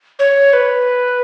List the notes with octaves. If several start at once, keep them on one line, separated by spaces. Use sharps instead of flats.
C#5
B4